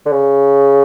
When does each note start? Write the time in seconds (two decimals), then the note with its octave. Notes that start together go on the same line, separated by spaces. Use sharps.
0.06 D3
0.12 C#3